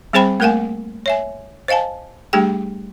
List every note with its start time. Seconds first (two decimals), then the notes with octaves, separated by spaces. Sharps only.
0.13 G3 C4 G#4 C5 G5 B5
0.40 A3 A#3 A#4 F5 F#5 G#5
1.06 C#5 E5 G#5
1.68 C5 D#5 F5 G#5 A5
2.33 G3 A3 D4 G4 G#4 G5